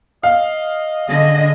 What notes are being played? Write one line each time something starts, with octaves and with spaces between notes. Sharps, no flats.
D#5 F5
D3 G#4 D#5